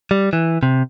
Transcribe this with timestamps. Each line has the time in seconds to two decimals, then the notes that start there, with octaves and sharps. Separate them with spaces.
0.11 G3
0.33 E3
0.63 C3